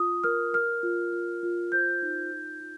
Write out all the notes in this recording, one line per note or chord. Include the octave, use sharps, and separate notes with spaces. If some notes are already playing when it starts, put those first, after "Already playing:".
Already playing: F4 D#6
A#4 F6
A#4 F6
F4
F4
F4
C5 G6
D#4
F4
F4